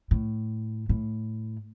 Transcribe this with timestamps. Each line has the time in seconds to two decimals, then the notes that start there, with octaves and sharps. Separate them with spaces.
0.11 A2
0.89 A2